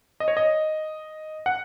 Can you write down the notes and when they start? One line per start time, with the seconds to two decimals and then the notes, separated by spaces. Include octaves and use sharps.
0.20 D#5
0.28 C#5
0.37 D#5
1.46 F#5